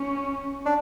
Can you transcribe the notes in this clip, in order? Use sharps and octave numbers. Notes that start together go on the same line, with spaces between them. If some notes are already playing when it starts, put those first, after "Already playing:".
Already playing: C#4
D4